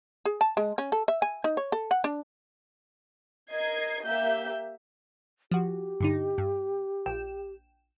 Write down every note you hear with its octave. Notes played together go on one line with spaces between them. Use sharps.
G#4
A5
G#3
C#4
A4
E5
G#5
D#4
C#5
A4
F#5
D4
A#4 D#5 G#6 C7
A#3 G4 E5 G6
F3 F#4 G4
G2 D3 D#4
G2
A#1 G5 E7